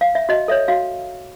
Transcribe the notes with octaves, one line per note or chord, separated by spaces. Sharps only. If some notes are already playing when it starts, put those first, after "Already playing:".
F5
E5
F#4 D#5
A4 C#5 E5
F#4 F5